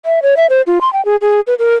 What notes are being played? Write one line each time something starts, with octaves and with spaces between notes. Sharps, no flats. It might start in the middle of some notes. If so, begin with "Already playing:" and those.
E5
C#5
E5
C5
F4
C6
G5
G#4
G#4
B4
A#4